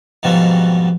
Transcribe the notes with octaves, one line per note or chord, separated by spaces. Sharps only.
F2 G#2 B2 D#3 F#3 G3